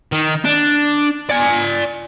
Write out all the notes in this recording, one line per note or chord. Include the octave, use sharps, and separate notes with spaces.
D#3
D4
D5 G#5